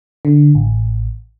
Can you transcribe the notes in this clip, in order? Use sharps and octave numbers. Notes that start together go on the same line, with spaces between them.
D3
A1